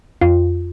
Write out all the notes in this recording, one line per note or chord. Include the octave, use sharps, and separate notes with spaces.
F2 F4